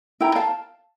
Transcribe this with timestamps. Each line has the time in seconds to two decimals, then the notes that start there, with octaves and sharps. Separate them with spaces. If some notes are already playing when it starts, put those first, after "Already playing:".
0.20 E4 G5 A#5
0.35 F5 A5